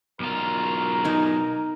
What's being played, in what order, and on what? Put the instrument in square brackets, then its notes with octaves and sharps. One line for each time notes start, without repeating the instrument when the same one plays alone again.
[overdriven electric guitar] B1 F4 [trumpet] A#4
[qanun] D#4 G#5